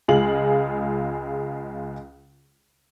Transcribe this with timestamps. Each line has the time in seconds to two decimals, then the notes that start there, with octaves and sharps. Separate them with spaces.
0.08 C#2 G#3 F4 G#4 F#7